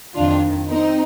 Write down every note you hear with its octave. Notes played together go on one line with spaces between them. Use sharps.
F2 D#3 D4 F4
C4 D#4